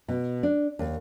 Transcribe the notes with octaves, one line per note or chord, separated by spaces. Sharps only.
B2
D4
D#2